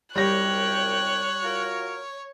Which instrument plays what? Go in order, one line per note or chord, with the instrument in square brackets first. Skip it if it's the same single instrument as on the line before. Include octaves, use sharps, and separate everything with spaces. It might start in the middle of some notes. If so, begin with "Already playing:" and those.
[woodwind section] C2 F#2 G5 [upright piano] G3 A#6 [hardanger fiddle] C#5 [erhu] F#6
[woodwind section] F4 F#4 A#4